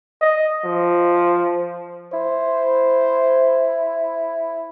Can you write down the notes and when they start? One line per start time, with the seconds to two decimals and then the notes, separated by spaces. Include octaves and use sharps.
0.21 D#5
0.65 F3
2.13 E4 C5